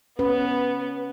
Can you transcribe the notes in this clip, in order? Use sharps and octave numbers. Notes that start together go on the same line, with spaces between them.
B3 C#4 B4